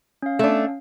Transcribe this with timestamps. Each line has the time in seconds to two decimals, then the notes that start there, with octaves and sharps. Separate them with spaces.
0.22 C#4 F5
0.39 A3 D4